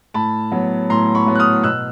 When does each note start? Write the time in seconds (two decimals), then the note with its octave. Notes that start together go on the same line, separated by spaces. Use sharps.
0.14 A2 A5 B5
0.52 F#3 B3
0.90 A2 A#5 C6
1.15 B5 C#6
1.26 F#3 B3
1.35 F#6
1.39 D#6 F6
1.64 B2 E6 F#6